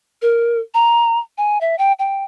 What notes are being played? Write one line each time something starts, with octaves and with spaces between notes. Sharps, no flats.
A#4
A#5
G#5
E5
G5
G5